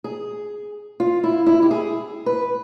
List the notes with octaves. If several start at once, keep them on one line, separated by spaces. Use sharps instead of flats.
G#4
F4
E4
E4
G4
G#4
B4